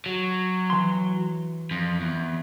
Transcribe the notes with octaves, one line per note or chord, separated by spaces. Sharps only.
F#3
E3 C6
F2
E2